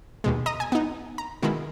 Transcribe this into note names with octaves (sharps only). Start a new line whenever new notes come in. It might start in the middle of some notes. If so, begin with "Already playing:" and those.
D#2 B2 G#3
D#5 A#5 D#6 A#6
G#5
B3 D#4
A#5
B2 D#3 G#3 E4